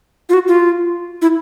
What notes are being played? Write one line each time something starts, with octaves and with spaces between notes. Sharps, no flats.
F4
F#4
F4
E4